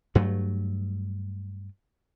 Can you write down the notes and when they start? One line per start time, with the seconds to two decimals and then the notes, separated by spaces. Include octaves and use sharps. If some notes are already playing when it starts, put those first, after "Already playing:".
0.15 G2 F#3 A3